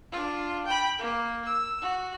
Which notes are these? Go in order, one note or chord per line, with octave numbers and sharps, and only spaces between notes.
D4 F4
G5 B5
A#3
E6
F#4